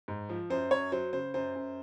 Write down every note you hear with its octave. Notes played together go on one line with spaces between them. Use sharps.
G#2
F3
F#2 C5
F#2 C#5
F#3 C5
C#3 C5
F#2 C5
F#2